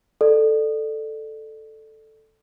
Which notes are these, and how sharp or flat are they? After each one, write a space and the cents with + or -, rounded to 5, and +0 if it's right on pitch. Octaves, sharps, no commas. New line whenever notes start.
A4 +0 D5 +25